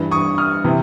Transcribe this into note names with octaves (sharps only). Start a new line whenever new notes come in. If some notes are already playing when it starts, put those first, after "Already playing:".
Already playing: G2 E3
C#6 D#6
D#6 F6
C3 E3